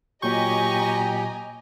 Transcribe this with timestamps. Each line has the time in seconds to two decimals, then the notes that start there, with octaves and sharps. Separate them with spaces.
0.23 A#2 F#3 G4 D#5 G#5 A#5 C#6 G6